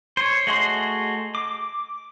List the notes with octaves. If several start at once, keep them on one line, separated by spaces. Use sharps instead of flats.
C5 C#5
A3 F#4 G#4 D#5 C6
D6